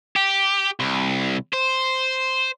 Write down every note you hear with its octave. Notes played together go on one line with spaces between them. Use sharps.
G4
C2
C5